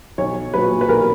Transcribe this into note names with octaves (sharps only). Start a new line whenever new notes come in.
B1 C#5
A#2 F#3 B4
B4
B1 A#4